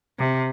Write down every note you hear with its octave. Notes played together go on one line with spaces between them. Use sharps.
C3